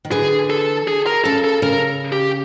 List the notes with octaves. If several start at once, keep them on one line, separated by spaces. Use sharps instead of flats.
D#3
D3 E3 G#4
A4
G#4
A#4
C#3 A4
A4
C#3 A#4
G4